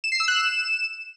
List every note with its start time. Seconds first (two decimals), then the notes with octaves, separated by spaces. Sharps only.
0.04 E7
0.12 C7
0.20 E6
0.28 F#6
0.36 E7